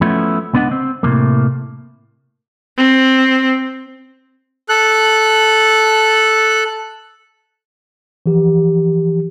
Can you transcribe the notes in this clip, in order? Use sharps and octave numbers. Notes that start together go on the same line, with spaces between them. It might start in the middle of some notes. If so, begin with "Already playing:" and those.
F3 A3 B3 C#4 E4
C#2 B3 D4 D#5 F#5
C4
A2 C3 A3 A#3
C4
A4 F#6
E3 F3 G4